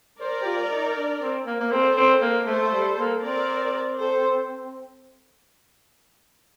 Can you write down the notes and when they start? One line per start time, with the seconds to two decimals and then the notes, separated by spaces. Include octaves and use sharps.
0.21 A#4 C5 D5
0.42 G4
0.45 F4
0.71 D#4
0.97 D4
1.21 C4
1.46 A#3
1.60 A#3
1.72 C4 A4 C5
1.97 C4
2.22 A#3
2.47 A3 A4 C5
2.61 A3
2.72 G3
2.97 A#3
3.22 C4 A#4 D5
3.98 A4 C5